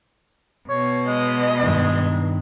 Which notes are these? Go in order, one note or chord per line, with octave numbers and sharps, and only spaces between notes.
B2 C#5
G#3 D#5
G2 D#3 G#3 D#4